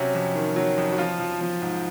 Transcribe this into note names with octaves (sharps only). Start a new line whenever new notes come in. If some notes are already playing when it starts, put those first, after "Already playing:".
Already playing: C3 F#3 C#4
F2
D#3
F#3
F2
F#4
F3 F4
F3
F3
G#2